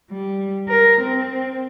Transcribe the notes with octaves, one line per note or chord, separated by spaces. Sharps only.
G3
A#4
C4